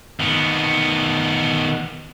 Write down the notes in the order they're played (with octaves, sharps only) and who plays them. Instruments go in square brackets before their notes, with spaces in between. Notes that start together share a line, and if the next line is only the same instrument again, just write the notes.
[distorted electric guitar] D#3 B3